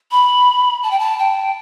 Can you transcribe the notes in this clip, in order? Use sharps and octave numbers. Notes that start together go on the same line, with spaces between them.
B5
A5
G5
A5
G5